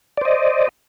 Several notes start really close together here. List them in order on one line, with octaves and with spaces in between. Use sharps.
D5 C5 D#5